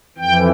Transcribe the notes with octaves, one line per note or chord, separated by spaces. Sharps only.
F2 E3 G5